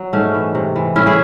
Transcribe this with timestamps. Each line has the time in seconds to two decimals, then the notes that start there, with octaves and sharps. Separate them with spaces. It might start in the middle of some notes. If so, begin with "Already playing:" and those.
Already playing: F#3
0.13 G#2 A3 C#4
0.34 E3
0.55 C3
0.76 E3
0.96 A2 C#4 E4
1.06 E4 G#4